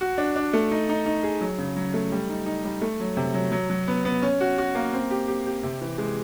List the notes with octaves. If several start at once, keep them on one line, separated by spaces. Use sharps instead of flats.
F#4
D4
D4
A3
D#4
D#4
D#4
G#4
F#3
C#3
F#3
A3
G3
D#4
D#4
G3
A3
F#3
C3
F#3
F#3
F#3
B3
B3
C#4
F#4
F#4
A#3
C4
G4
G4
G4
C3
E3
G#3